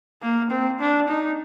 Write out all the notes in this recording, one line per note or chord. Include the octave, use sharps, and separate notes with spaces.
A#3
C4
D4
D#4